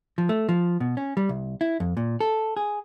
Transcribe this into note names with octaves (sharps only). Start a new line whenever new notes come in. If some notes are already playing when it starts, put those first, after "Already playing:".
F3
A3
F3
B2
C#4
G3
C2
E4
F2
A#2
A4
G#4